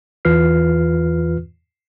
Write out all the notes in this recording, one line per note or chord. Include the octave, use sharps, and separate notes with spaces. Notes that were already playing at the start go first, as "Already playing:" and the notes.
E2 E3 F4 B4 F6 C7